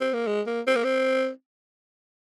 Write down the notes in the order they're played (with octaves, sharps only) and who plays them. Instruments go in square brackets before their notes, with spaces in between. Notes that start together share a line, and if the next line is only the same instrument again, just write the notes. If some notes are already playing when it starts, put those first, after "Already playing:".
[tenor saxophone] C4
A#3
G#3
A#3
C4
A#3
C4